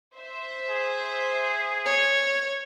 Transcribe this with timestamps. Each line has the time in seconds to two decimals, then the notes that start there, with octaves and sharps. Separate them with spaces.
0.16 C5 E5
0.70 G#4
1.86 C#5